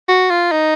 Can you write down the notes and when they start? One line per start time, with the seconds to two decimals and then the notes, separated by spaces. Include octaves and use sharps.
0.09 F#4
0.30 F4
0.52 D#4